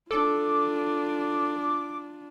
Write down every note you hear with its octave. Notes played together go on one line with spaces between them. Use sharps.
D4 F4 A4 D6